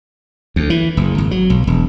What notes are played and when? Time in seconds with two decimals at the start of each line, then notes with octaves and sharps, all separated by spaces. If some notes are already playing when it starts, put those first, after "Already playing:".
0.56 D2
0.70 E3
0.97 F#1
1.18 G#1
1.31 F#3
1.50 B1
1.67 E1